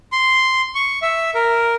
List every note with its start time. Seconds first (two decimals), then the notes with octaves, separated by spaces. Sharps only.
0.12 C6
0.75 C#6
1.02 E5
1.35 A#4